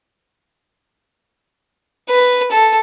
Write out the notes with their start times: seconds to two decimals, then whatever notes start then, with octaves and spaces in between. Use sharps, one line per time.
2.10 B4
2.52 A4